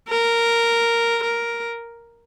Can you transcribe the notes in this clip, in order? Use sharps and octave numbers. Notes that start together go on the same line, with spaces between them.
A#4
A#4